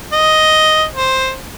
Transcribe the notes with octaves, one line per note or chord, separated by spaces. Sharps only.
D#5
C5